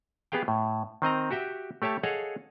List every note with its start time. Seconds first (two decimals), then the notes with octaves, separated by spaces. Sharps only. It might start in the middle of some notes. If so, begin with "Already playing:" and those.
0.32 B3 G4 G#4 F5 G5
0.48 A2
1.02 D#3 C4 D#5 A#5
1.31 F#4 G4 E5 G5
1.82 A3 G4 C#5 E5 A5
2.03 G#4 A4 C#5 D#5 F5 F#5